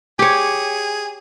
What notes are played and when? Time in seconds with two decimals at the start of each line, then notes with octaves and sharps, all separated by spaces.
0.19 G4 G#4 C#5